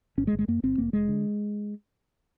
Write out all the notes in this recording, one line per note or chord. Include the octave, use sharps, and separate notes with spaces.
G1 C#4
G#3
G1
G#3
F#2 A#3
G1 C4
F1 A#3
F1 G#3
D3